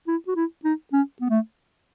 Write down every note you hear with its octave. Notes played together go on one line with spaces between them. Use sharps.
E4
F#4
E4
D#4
C#4
B3
A3